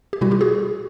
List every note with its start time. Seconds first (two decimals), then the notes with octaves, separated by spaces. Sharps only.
0.13 G4
0.21 B2 G3 E4 F#4
0.31 F4 G4
0.41 F#4 G#4